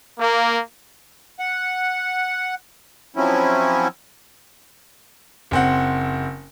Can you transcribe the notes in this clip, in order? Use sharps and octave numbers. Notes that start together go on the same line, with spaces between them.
A#3
F#5
F3 F#3 C4 C#4 E4
F#1 C4 F#5